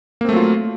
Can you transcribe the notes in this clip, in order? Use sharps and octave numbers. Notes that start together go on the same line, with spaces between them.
F#3 A3 A#3 C4 F4